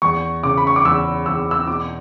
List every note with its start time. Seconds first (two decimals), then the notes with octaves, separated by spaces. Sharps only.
0.02 E2 C#6
0.43 C#3 D6
0.57 B5
0.67 C#6
0.76 D6
0.85 E2 E6
1.26 E2 E6
1.51 E6
1.67 B2 D6